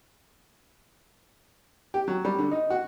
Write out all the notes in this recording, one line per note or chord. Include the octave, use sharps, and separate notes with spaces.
G4
F#3
G3
D3
D#4
F#4